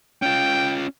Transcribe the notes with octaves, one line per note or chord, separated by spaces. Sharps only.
C#4 F4 G5